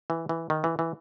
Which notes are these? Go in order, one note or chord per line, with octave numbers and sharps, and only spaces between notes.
E3
E3
D#3
E3
E3